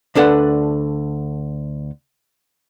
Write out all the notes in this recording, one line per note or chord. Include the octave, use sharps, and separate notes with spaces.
D2 D4 A4 B4 F#5